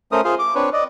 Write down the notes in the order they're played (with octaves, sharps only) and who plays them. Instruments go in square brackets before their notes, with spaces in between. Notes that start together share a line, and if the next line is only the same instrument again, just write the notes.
[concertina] A3 C#4 A#4 C5 D#6
F4 G#4 C5 F5
D6
C4 D4 B4 C#5
D5 D#5